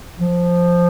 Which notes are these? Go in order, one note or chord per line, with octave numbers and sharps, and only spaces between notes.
F3